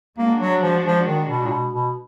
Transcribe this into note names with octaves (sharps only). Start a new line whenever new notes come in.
G#3 A#3 D4 F#4
F#3
F3
F3
D#3
B2
A#2
B2
B2